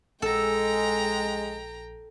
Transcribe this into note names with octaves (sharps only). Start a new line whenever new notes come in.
A#1 G#3 A4 G5 A#5